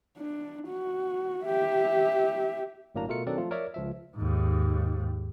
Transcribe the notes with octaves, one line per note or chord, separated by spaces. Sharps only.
D4
F#4
G4 E5
G1 A2 F#3 A#3 D4 A#5
B2 A3 F4 A#4 C#7
D#3 F#3 C4 D4 A4 D5
F3 A3 F4
A#4 C#5 D5 E5 A#5
C#2 F3 E5
D#2 G#2